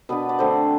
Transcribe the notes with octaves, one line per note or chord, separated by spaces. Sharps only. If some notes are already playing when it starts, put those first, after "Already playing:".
B2 B3 D4 B4
D5
D3 A3 C4 C5